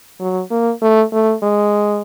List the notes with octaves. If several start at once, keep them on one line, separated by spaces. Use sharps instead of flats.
F#3
A#3
A3
A3
G#3